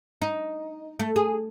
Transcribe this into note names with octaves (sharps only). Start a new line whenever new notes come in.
D#4
A3
G#4